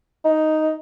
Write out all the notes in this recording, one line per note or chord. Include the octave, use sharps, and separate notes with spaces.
D#4